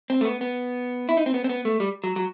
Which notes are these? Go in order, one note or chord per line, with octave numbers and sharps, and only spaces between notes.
C4
A3
B3
B3
E4
D#4
C4
B3
C4
B3
A3
G3
F#3
F#3